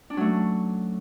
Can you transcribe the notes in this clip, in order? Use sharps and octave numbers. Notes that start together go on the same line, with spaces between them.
F#3 A3 C#4 D4